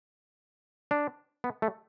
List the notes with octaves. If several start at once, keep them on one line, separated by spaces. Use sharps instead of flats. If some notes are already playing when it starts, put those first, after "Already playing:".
D4
B3
A3